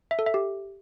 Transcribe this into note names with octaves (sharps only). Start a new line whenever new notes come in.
E5
A4
E5
G4